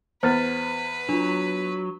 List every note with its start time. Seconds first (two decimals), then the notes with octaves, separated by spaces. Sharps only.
0.23 E2 B3 B4 C5 F6 A6
1.09 F#3 D4 F4